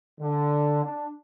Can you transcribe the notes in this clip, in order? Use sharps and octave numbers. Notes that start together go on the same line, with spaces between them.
D3
D4